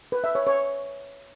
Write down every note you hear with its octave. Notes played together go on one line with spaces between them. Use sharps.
B4
E5
C#5
C#5